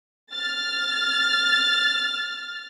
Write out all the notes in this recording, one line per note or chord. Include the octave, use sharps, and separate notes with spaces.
F6 A6